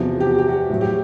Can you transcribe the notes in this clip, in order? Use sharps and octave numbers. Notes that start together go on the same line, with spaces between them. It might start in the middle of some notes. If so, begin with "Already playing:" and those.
Already playing: E2 C3 F3 F#4
G4
F#4
G4
F#4
A2 F#3
G4